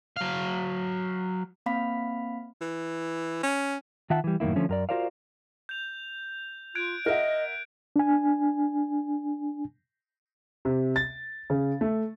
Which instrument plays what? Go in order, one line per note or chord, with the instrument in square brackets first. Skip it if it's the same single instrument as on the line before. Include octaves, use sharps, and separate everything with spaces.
[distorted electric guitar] F#3 F5
[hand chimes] A#3 C4 F5 B5 B6
[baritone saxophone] E3
C#4
[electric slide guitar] D#3 F4 E5 F#5 A5
E3 G3
F#2 A2 D#3 A#3 E4
D3 F3 A3 C#4
F#2 A#4 D5
F4 F#4 A#4 C5 D5 F5
[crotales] G6 F7
[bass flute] F4 [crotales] F#6 G#6 D7
[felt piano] A#4 E5 F#5 [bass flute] D#5
[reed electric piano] D4 G#5
[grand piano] C3
A6
C#3
A3